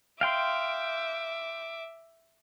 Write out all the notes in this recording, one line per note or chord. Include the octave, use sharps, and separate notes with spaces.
E5 F5 G5 C6 D6